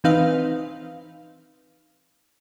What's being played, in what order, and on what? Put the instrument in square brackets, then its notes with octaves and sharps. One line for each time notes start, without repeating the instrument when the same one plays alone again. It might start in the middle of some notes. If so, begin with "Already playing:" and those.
[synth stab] E3 C4 D#4 B4 F5